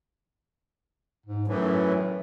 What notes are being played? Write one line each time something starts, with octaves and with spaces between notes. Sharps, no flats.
G#2
F#2 A2 E3 F#3